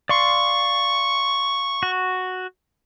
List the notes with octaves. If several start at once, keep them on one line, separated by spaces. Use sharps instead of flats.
D5 F5 C6 C#6
F#4